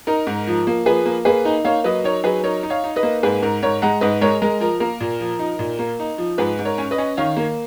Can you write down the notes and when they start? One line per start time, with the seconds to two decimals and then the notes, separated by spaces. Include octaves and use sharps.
0.07 D#4 A#4
0.27 G#2
0.47 F3
0.67 A#3
0.86 F3 G#4 B4
1.06 A#3
1.25 A#3 G#4 B4
1.45 D#4
1.65 A#3 C#5 F5
1.84 F#3 B4 D#5
2.04 D#4 A#4 C#5
2.24 F#3 G#4 B4
2.44 D#4 A#4 C#5
2.63 D#4
2.70 C#5 F5
2.84 D#4
2.96 B4 D#5
3.03 A#3
3.23 G#2 G#4 B4
3.42 G#2 A#4
3.63 G#2 A#4 C#5
3.82 G#3 F#5 A#5
4.01 G#2 B4 D#5
4.21 G#3 A#4 C#5
4.42 G#3 A#4
4.60 F3 A#4
4.80 A#3 A#4
5.01 A#2
5.20 F3
5.39 D#4
5.59 A#2
5.79 A#3
6.00 D#4
6.18 F3
6.38 G#2 G#4 B4
6.59 G#2
6.65 A#4 C#5
6.78 C#4
6.91 B4 D#5
6.98 C#4
7.17 D#3 C#5 F5
7.37 A#3